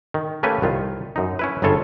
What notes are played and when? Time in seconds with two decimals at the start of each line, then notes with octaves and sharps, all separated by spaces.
0.14 D#3
0.43 A3 A#3 C#4 G4 B4 G#5
0.62 C2 D#3 F4
1.16 F#2 D#4
1.39 C#4 E4 B4
1.62 G1 F2 C#3 F4 A4 C#5